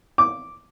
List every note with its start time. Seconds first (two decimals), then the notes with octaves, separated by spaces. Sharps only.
0.18 D6